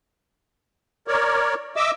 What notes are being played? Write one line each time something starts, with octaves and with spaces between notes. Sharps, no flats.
A#4 C#5 D5
D#5 E5 D6 E6